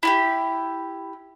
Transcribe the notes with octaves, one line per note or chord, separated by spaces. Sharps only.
E4 F#4 G4